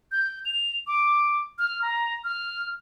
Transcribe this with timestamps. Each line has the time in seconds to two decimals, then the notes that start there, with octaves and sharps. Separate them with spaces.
0.12 G6
0.45 F7
0.87 D6
1.59 F6
1.82 A#5
2.24 F6